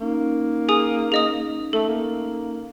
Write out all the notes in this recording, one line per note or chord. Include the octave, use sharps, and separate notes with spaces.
A#3 C#4 D#4
G#4 G#5 D#6
G#4 D#5 D#6
A3 A4
A#3